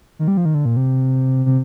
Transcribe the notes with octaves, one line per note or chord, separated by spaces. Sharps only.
D#3
G3
F3
D#3
D3
A#2
C3
C3